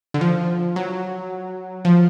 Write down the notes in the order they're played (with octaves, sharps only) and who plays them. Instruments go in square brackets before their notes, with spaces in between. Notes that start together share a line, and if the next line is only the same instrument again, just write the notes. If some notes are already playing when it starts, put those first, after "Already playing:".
[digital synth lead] D3
F3
F#3
F3